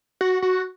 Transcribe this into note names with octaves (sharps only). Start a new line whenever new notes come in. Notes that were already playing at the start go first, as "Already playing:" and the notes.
F#4
F#4